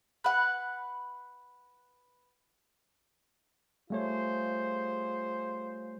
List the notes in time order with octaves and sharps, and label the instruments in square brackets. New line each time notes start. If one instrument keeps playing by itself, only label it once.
[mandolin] B4 F#5
[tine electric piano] G3 A3 C#5 [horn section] F4 G#4 C5